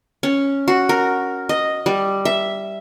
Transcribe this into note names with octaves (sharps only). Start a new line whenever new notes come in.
C#4
F#4
A#4
D#5
G3
E5